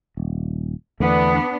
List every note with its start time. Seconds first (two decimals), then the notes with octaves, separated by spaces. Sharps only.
0.17 D#1
1.00 E2 D3 A3 B3 D4